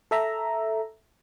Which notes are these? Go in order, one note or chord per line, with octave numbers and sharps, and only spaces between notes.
A4 E5 A#5